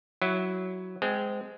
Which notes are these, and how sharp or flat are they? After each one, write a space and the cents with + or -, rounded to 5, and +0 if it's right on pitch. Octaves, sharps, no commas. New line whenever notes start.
F#3 +0 E4 -5
G#3 +0 C4 -25